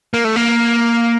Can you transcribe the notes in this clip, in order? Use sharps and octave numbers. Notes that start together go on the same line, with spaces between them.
A#3
A3
A#3